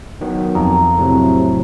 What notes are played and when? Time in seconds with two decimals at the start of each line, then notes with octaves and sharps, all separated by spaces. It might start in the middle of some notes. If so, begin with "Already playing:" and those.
0.21 D#3 F#3 B3
0.55 F2 A#5
0.98 A2 C3 F#3